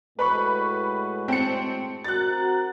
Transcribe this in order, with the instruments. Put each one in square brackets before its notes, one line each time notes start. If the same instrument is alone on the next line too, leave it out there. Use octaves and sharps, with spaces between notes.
[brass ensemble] A2 G#3 F#4 [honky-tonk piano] B4 B5 C#6
[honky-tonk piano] C4 A5 C#7
[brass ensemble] C4 F#4 A#4 [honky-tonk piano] F#6 A6